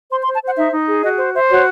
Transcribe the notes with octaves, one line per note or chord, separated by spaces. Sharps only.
C5 C6
C6
C5
A5
C5 F#5
D#4 E5
D#4
G#4
F#4 D#5
C5
C5 E5
F#4 C#5